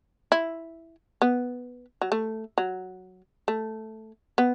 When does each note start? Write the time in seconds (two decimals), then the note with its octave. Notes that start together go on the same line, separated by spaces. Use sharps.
0.32 E4
1.22 B3
2.02 F#3
2.12 A3
2.58 F#3
3.48 A3
4.38 B3